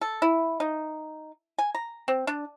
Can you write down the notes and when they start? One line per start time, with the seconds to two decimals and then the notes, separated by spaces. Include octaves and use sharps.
0.01 A4
0.22 E4
0.60 D#4
1.58 G#5
1.75 A#5
2.08 C4
2.27 D4